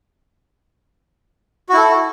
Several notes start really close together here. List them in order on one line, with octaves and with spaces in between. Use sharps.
F#4 E4 A4